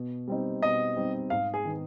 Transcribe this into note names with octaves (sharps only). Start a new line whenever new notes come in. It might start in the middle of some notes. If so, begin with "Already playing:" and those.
Already playing: B2
G3 C4 D#4
B2 D#5
G3 C4 D#4
G#2 F5
G#4
D#3 B3